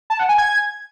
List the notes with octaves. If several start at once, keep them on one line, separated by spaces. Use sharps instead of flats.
A5
F#5
G#5
G#6